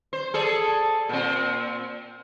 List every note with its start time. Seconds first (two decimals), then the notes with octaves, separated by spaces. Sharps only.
0.13 C5
0.34 G#4 A4 D5
1.09 A#2 C4